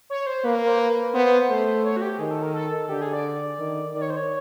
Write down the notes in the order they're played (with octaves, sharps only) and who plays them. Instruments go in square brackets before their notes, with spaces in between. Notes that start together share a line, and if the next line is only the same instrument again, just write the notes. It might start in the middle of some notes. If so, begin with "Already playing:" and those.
[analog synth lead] C#5
C5
[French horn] A#3 [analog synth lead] B4
[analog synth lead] A#4
C5
B4
[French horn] B3 [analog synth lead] C5
[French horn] A3 [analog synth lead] C5
[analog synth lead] C#5
F#4
G4
[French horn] D#3 [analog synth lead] G#4
[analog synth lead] A4
A#4
A4
[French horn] D3 [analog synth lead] G4
[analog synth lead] G#4
D5
[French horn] D#3
[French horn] D#3 [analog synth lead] D5
[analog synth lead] C#5
C5
C#5